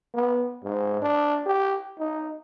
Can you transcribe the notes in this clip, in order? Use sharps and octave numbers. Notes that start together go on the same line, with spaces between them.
B3
G#2
D4
G4
D#4